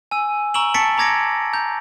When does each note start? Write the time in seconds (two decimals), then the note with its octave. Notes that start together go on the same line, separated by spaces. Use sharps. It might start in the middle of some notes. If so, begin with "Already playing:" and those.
0.11 G#5 E6 D#7
0.54 A#5 C#6 E6 D7 E7 F#7
0.74 A5 C#6 A6 B6 C#7 D7
0.98 A#5 D6 G#6 A#6 C#7 D7
1.53 A#5 G6